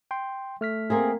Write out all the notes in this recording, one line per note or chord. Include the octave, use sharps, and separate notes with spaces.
G5 C6
A3 F6 B6
A#3 C4 G#4